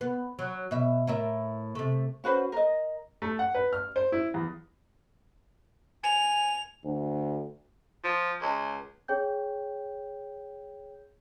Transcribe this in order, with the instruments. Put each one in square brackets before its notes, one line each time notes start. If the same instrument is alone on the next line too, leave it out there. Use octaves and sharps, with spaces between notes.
[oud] B3
F#3
B2 E5
A2 A#4 E5
C3 A3
[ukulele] C#4 F#4 B4 C5
A#4 D#5
[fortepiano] A3
F#5
B4
F6
C5
E4
E2
[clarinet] G#5 [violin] F7
[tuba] D2
[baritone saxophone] F3
C#2
[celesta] G#4 C#5 G5 G6